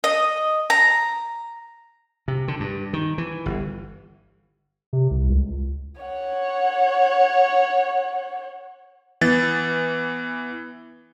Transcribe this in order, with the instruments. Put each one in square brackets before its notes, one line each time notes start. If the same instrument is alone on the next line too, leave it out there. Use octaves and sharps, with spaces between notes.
[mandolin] D#5
A#5
[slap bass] C3
D3
G2
D#3
E3
G1
[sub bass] C3
C2
C#2
[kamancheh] C#5 F#5
[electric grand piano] E3 B3 A6